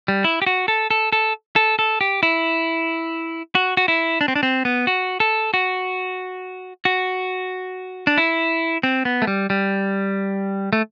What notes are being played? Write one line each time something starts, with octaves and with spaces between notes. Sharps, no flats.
G3
E4
G4
F#4
A4
A4
A4
A4
A4
G4
E4
F#4
F#4
E4
D4
C4
D4
C4
B3
F#4
A4
F#4
F#4
D4
E4
C4
B3
A3
G3
G3
A3